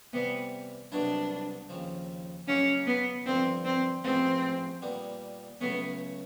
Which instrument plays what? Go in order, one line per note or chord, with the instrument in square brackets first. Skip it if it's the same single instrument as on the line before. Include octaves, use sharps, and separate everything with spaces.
[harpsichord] C3 E3 G3 [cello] B3
[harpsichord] C2 B2 F#3 B3 E4 [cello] D4
[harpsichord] D#2 C#3 F3
[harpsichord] C#3 F#3 A#3 D#4 [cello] C#4
[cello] B3
[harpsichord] G2 D3 F3 [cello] C4
[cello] C4
[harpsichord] A1 G#2 F3 G#3 B3 [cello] C4
[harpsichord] A#2 G3 B3
[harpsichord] C#2 C#3 F#3 A3 C#4 [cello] B3